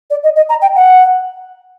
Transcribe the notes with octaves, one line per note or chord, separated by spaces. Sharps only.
D5
D#5
D#5
A#5
G5
F#5